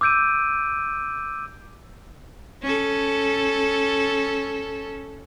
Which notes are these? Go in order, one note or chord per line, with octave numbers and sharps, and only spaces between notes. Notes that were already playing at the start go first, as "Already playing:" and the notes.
D6 E6 G6 D7 D#7
C#4 A4